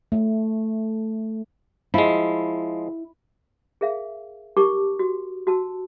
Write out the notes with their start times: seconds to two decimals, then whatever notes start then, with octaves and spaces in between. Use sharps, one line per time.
0.12 A3
1.94 F3 G#3 E4
3.81 G#4 A#4 E5 F5
4.57 D#4 G4 A#4 A5 C#6 D6
4.99 F#4
5.47 F#4 A5 E6